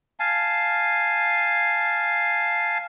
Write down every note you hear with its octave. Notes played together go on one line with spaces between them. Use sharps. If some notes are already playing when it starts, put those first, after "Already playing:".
F5 G#5 A5